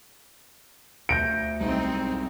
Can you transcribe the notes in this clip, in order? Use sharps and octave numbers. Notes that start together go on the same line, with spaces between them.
D2 G6 A#6 D7
B1 G3 G#3 C4 D#4